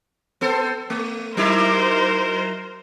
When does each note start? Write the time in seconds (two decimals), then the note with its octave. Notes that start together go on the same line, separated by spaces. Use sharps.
0.41 B3 A4 C5
0.90 A3
1.37 F#3 D#4 E4 A#4 C5